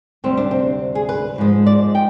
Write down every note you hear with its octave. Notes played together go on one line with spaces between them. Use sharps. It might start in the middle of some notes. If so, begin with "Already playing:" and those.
D2 C3 G3 C4
D4
C4
G#4
B4
G#2 F3 G#3
D5
G5